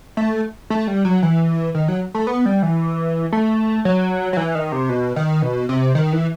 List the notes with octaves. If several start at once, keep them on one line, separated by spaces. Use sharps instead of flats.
A3
A3
G3
F#3
E3
D#3
F#3
A3
B3
G3
E3
A3
F#3
F#3
E3
D#3
C3
B2
D#3
B2
C3
D#3
E3